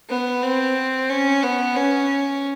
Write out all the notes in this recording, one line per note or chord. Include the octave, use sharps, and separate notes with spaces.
B3
C4
C#4
B3
C#4